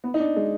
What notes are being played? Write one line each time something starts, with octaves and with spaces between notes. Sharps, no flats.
B3
D#4
D4
G#3